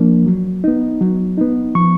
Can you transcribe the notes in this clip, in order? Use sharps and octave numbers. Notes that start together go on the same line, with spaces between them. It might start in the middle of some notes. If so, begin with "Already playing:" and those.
Already playing: F3 A#3 D4
F#3
B3 D#4
F#3
B3 D#4
F3 C#6